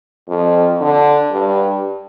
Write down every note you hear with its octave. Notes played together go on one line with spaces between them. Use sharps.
F2
D3
G2